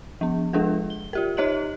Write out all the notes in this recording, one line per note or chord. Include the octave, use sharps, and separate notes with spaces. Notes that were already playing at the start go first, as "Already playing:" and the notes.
F3 B3
F3 G#3 D4 G#4 A4
G7
F4 G4 A#4
D#4 G4 C#5 D#5 F#6 F#7